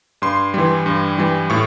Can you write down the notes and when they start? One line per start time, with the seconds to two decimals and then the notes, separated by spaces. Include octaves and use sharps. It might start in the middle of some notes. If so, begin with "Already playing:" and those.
0.22 G2 C6
0.54 E3 G3
0.86 G2
1.18 E3 G3
1.50 A2 C#6